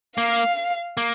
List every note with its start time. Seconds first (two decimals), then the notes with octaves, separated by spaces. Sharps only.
0.17 A#3 F5
0.97 A#3